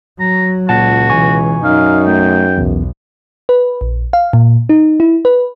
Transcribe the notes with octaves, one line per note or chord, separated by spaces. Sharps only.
F#3 A#5
C#2 A#2 F#4 F#5 A5
B2 E3 G#5 C#6
F#2 D#4 F5
A3 G5
B1 E2
B4
A#1
F5
A#2
D#4
E4
B4